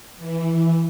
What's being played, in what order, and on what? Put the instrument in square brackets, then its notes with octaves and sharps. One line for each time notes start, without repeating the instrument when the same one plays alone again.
[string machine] E3